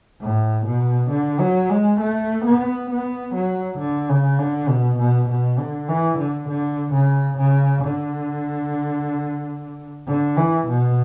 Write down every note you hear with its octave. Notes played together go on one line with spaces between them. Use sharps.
A2
B2
D3
F#3
G#3
A3
B3
B3
F#3
D3
C#3
D3
B2
B2
B2
D3
E3
D3
D3
C#3
C#3
D3
D3
E3
B2